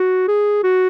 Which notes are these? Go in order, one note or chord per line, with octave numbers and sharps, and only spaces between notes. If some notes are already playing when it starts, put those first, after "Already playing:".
Already playing: F#4
G#4
F#4